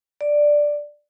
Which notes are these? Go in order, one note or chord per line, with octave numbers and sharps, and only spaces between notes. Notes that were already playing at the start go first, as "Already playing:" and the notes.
D5